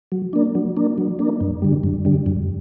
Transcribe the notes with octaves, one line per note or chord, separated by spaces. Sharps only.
F#3
A#3 D4
F#3
A#3 D4
F#3
A#3 D4
F#2
D3 G3
F#2
D3 G3
F#2